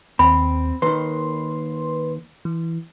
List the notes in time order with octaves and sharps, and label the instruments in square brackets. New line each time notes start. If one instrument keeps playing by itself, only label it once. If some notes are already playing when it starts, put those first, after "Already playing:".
[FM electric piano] D#2 [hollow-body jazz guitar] C4 [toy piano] B5
[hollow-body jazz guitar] D#2 D#3 [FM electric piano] B4 C6
[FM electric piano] E3